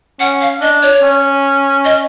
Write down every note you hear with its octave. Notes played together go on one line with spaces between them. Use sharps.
C#4 F#5
F5
D4 D#5
C#5
C#4
D#5